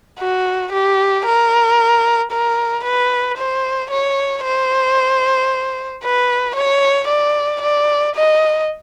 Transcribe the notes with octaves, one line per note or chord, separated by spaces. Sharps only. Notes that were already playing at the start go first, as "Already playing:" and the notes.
F#4
G4
A#4
A#4
B4
C5
C#5
C5
B4
C#5
D5
D5
D#5